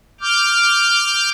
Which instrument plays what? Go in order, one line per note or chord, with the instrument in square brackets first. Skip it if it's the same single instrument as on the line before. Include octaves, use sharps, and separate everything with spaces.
[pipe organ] D6 F6 G6